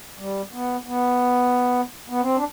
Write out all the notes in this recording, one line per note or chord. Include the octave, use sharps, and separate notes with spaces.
G3
B3
B3
B3
C4
D4